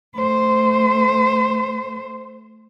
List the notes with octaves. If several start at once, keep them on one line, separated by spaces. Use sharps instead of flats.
A3 C5